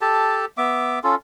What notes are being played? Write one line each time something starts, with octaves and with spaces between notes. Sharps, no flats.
G4 A4 A5
B3 E5 D6
C#4 F4 A4